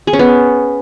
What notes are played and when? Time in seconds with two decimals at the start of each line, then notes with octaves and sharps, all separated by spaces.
0.07 G#4
0.13 C#4
0.19 B3